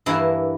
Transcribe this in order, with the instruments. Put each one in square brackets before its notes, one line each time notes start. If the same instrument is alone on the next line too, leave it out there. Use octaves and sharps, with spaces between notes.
[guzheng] G2 E3 A#3 E4